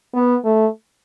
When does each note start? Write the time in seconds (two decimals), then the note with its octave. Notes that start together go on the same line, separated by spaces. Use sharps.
0.14 B3
0.45 A3